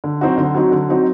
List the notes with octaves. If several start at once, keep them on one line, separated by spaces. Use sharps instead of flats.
D3
F#3 C4 D#4 F#4
D3
F#3 C4 D#4 F#4
D3
F#3 C4 D#4 F#4